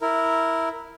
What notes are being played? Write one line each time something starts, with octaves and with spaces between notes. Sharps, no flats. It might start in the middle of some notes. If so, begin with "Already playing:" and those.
E4 A#4